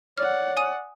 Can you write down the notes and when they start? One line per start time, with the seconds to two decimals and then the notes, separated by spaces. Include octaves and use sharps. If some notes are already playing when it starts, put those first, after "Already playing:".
0.18 C#5 D5 F#5 F6
0.57 G#5 D#6 D#7